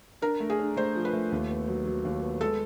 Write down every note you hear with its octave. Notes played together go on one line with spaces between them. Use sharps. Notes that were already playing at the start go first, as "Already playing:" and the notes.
D4 A#4
A3
G#4
D4
A3 C5
F3
B4
A3
D#2
B3
F#3
F#3
D#2
B3
G#3 A4